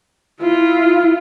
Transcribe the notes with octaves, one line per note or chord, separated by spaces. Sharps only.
E4 F4